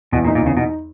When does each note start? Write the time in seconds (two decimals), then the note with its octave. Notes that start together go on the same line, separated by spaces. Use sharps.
0.12 E2 B2
0.24 A#2
0.28 D#4
0.35 A#2
0.42 E2 C#3
0.57 B2 D#4